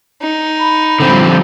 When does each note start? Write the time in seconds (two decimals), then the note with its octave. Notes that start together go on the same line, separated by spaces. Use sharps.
0.22 D#4
0.60 B5
1.00 D3 F3 G3 C4